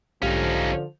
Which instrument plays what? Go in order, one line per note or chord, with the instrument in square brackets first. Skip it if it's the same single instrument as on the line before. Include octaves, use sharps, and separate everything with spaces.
[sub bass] B1 [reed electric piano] G#2 G4 F5 [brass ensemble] D3 F3 [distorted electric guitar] C#4 D#4